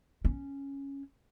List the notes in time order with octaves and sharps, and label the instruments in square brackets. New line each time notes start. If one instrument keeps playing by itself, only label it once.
[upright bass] C#4